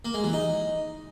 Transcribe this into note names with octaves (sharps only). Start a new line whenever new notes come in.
A#3
G#3
E3
D#4